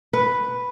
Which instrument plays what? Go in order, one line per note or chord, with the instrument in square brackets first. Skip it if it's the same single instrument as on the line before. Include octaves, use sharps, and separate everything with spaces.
[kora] B4